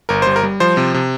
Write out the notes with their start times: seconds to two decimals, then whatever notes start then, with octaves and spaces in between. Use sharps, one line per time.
0.09 G1 A#4
0.22 G3 C5
0.36 A#4
0.43 G3
0.60 F3 C5
0.77 C3
0.94 C3